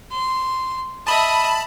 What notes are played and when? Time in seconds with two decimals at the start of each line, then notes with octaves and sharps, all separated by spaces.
0.12 C6
1.07 D#5 E5 A5 B5